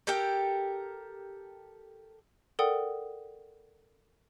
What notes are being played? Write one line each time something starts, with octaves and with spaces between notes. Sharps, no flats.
G4 A4 A#4 G5
A4 A#4 D5 F#5 G5 D#6